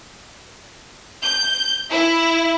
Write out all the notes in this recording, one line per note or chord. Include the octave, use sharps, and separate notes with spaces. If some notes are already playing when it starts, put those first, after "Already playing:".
G6
E4